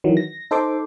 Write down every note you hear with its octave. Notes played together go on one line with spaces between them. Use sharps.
D#3 E3 F#3
A#6
D#4 A4 C5 C6 D6